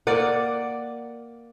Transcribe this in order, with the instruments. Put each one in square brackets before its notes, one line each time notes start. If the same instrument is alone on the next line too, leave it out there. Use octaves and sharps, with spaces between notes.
[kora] A#3 D5 F#5